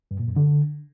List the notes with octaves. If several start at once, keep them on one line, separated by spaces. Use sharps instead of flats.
G2
A#2
F#2
D3